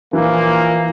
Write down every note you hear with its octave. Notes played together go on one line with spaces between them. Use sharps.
A#2 E3 F3 A#3